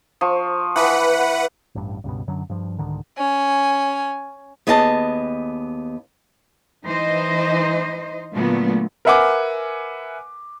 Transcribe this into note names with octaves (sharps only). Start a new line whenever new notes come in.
F3 C#6
E3 B4 F#5
A1 G2
C#2 G2 B2
F#2 D3 F#3
G2 F3
C2 G#2 D3 D#3
C#4 G#5
D#2 B3 G#4 D#5 G#5 A5
E3 D#4 C5 D#5
A#2 D3 F#3 A3 B3
A#4 B4 E5 F#5 G#5 D6